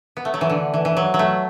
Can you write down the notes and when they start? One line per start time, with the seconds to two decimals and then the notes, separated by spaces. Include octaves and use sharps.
0.17 B3
0.25 A3
0.34 F#3
0.41 E3
0.50 D3
0.74 E3
0.85 E3
0.97 F#3
1.14 F#3
1.19 A3